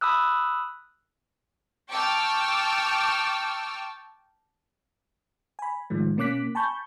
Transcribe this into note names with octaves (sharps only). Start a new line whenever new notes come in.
B5 D#6 E6 F#6
G5 A5 C#6 D6 E6 F6
G#5 B5
A2 D#3 F3 G#3
B2 A#3 C#4 D6 F#6 B6
G#5 A5 B5 C#6 G6